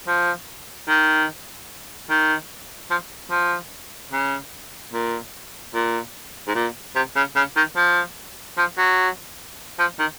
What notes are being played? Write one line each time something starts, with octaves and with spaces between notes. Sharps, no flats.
F3
D#3
D#3
F3
F3
C#3
A#2
A#2
G#2
A#2
C3
C#3
C#3
D#3
F3
F3
F#3
F3
D#3